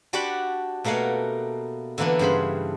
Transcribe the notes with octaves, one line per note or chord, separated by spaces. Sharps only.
D4 F#4 G4 D5 F#5 B5
B2 A3 A#3 F5 F#5 G#5
D3 E3 A#3 B3 D4
G2 C#3 C5 B5